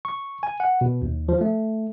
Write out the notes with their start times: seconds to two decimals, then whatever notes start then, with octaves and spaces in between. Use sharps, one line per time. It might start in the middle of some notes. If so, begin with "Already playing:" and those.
0.05 C#6
0.43 G#5
0.60 F#5
0.81 B2
1.02 D#2
1.29 F3
1.41 A3